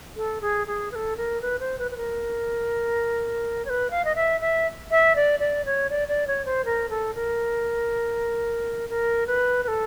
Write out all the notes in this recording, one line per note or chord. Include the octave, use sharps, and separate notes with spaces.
A4
G#4
G#4
B4
A4
A#4
B4
C5
B4
B4
A#4
C#5
B4
F5
D#5
E5
E5
E5
D5
D5
C#5
D5
D5
C#5
C5
A#4
A4
A#4
A#4
B4
B4
A4